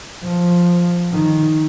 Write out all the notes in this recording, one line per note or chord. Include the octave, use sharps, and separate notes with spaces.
F3
D#3